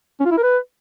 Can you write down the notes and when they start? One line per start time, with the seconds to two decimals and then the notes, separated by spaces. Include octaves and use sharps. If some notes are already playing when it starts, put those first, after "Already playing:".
0.20 C#4
0.26 F4
0.31 E4
0.37 A#4
0.43 B4